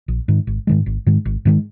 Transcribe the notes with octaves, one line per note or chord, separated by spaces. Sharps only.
A#1
G#2 D#3
G#1
G#2 D#3 G#3
G#1
G#2 D#3 G#3
G#1
G#2 D#3 G#3